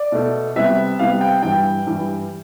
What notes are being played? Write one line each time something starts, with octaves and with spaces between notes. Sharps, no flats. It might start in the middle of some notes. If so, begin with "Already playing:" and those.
Already playing: D5
B2 A3
C3 G3 B3 E5
C3 G3 B3 F5
G5
G2 E3 G3 G5
G2 E3 G3